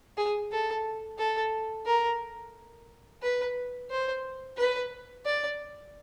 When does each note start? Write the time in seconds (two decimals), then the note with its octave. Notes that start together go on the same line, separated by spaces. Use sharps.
0.18 G#4
0.52 A4
1.19 A4
1.86 A#4
3.22 B4
3.90 C5
4.57 B4
5.25 D5